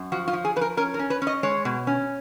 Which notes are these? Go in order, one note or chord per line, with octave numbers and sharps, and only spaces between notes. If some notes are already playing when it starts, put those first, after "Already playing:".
Already playing: F#2
F3 F#4
F4
F3
G#4
F3 B4
A#4
C#4 A#4
A#4
C#4
B4
C#4
D#5
G#3 C#5
B2
C#4